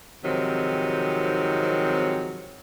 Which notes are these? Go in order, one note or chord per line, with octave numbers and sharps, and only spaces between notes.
G#2 C3 D#3 F3 F#3 C4